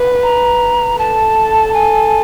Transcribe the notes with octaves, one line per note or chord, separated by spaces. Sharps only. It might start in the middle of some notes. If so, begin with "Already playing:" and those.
Already playing: B4
A#5
A4 A5
G#5